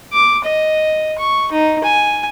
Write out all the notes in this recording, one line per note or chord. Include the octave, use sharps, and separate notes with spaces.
D6
D#5
C#6
D#4
G#5